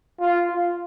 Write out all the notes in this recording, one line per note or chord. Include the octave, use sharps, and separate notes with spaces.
F4
F4